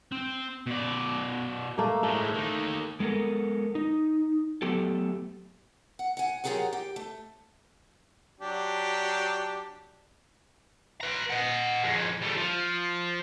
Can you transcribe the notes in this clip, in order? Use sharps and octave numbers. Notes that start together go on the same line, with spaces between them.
C4
B2 D5
A3 A#3
A2 G#3 A3
A#3 D#4
G#3 B3 A4 A#4
D#4
F#3 A3 B3 G4 A4
F#5
F#5 G#5
F#3 F4 G4 G#4 A#4 F#5
G4
A3
F#3 D4 G4
B4 A#5
D#5 F#5
F2 G#3
G3 A3
F3